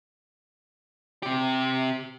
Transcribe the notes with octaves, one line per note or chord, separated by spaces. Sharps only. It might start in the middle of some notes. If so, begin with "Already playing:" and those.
C3 G4